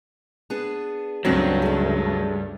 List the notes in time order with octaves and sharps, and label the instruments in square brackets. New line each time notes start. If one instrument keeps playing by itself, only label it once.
[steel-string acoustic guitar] B3 D4 G#4
[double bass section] C#2 C#3 A3 [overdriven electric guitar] G2 [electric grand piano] F#3 [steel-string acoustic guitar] C4 D4 F#4
[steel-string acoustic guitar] G#4 A4